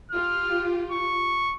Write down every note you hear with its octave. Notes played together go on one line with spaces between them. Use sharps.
F4 G4 F6
C#6